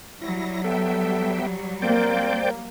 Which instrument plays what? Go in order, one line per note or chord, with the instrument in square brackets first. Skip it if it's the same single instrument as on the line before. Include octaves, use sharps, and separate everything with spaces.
[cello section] F#3 G3 [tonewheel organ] E4 A#6
[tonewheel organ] B3 E5 G5 [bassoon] A4
[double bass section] A#3 [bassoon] C4 [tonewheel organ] C5 D5 G5